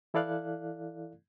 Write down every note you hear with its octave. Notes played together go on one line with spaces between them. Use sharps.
E3 E4 A4 D5 F5 F#6